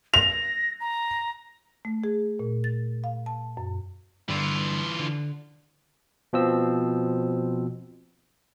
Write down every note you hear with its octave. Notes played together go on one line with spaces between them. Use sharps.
A#6 F7
A#5
A3
G#4
A#2
A6
F5
A5
F#2
G2 D3 E3 F4
D3
B2 F3 C4 E6